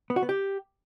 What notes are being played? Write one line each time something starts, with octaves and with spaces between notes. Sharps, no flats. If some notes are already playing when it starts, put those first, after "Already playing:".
B3
F#4
B3
G4